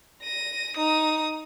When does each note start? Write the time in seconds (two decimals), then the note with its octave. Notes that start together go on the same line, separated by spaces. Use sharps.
0.22 A#6 D#7
0.76 D#4 D#6